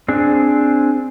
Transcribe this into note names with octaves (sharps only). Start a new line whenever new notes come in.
C4 D4 G#4